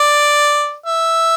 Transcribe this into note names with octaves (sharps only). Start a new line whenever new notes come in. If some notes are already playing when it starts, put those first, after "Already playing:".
Already playing: D5
E5